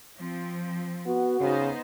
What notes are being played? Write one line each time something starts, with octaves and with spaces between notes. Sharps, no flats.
F3 C4
B3 F#4
C#3 B3 D#4 C5